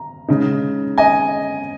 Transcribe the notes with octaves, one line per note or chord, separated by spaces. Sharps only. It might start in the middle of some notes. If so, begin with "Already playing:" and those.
Already playing: A#5
C#3 G#3 D#4
D#5 G#5